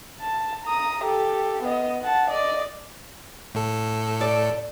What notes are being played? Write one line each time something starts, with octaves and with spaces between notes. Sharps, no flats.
A5
A#5 D#6
G4 A4
B3 D#5
F#5 A5
D5 D#5
A2 A4
D5